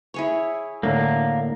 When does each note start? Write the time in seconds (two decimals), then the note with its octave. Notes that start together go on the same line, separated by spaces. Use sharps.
0.14 E4 G#4 C#5
0.83 A2 D3 A#3 A#5